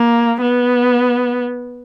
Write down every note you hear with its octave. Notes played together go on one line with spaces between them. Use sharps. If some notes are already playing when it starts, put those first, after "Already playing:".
Already playing: A#3
B3